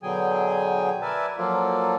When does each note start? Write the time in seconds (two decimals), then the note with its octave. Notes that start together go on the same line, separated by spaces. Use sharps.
0.03 B2 D3 F#3 G#4 G5 G#5
1.02 A#4 B4 D5 E5 G#5 A5
1.38 F3 F#3 A#3 F4 A4 D5